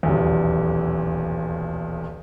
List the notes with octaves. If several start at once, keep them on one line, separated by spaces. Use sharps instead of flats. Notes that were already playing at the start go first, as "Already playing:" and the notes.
D#1 B1 E2